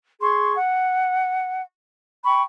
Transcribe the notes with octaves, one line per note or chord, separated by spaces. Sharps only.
G#4 C6 C#6
F#5
G5 B5 C#6